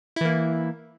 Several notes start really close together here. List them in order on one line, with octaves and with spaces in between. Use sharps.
E4 E3 A#3